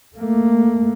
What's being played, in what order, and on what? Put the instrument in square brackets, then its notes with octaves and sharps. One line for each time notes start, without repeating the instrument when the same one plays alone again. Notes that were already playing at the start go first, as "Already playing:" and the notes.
[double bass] A3 A#3